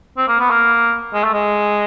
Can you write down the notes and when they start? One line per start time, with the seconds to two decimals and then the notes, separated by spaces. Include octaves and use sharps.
0.17 C4
0.28 A#3
0.39 B3
0.50 A#3
1.14 G#3
1.24 A3
1.33 G#3